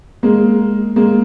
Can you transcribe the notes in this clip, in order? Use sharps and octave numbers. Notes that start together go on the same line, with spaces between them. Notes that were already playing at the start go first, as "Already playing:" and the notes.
G#3 A#3
G#3 A#3